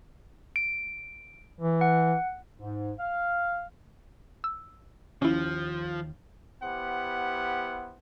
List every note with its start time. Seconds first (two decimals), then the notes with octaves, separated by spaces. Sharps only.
0.56 D7
1.60 E3
1.81 F#5
2.59 G#2
2.99 F5
4.44 E6
5.22 D#2 F3 C#4 E4
6.62 B3 E4 G4 C5 F#5